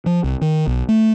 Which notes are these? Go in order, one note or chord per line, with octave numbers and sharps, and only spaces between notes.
F3
C2
D#3
B1
A3